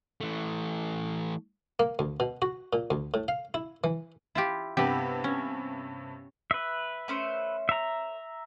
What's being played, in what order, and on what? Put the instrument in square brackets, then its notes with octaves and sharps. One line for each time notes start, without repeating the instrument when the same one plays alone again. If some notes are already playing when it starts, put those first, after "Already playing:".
[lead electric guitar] E3 A3
[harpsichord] A#3
D2
B2
F#4
A#2
D2
A2
F5
E4
E3
[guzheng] E4 F4 G4
[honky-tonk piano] G2 C3 [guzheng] B3 G4
[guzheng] C#4
[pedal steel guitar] B4 E5
[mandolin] A3 C#4 C5
[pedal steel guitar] E5 A#5